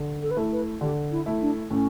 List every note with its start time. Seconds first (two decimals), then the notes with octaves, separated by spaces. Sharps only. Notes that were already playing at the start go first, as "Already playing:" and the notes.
Already playing: D3
0.22 A4
0.30 B4
0.37 A3 E4 A4
0.51 B4
0.81 D3 G4
1.11 E4
1.26 A3 E4
1.41 D4
1.70 A2 C#4